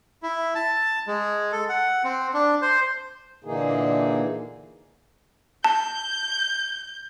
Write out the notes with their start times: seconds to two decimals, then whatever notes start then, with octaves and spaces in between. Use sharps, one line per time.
0.23 E4
0.55 A5
1.07 G#3
1.52 A4
1.69 F#5
2.04 C4
2.34 D4
2.62 C5
3.45 A#2 D3 E3 A#3 D#4 G#4
5.64 A5 G6